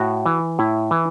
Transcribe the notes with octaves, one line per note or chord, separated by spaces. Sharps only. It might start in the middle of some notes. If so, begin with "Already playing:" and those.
Already playing: A2 F#4
E3
A2 E4
E3